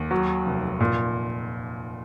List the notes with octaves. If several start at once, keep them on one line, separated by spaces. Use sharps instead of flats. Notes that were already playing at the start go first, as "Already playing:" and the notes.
Already playing: D#2
F#3
F1
A#2